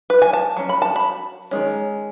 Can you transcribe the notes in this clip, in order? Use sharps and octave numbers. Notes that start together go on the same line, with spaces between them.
B4
G#5
A5
F#3 C#4
B5
A5
B5
D#3 G#3 C#4